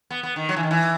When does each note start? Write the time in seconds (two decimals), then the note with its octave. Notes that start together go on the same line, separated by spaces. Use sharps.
0.11 B3
0.23 B3
0.36 D#3
0.49 F#3
0.56 E3
0.63 D#3
0.71 E3